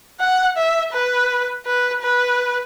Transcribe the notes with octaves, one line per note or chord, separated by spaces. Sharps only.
F#5
E5
B4
B4
B4